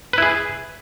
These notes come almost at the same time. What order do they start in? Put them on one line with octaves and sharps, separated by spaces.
B4 E4 G#4